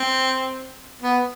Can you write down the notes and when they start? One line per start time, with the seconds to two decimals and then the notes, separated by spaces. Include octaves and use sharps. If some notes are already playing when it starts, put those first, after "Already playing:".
Already playing: C4
1.02 B3